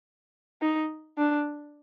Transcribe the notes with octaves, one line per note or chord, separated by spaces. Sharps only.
D#4
D4